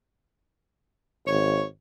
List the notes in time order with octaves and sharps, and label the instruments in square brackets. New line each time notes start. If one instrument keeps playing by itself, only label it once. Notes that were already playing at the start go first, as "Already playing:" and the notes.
[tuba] G#1 [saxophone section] C#5